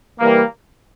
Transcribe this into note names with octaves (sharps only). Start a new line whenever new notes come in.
E3 G3 A#3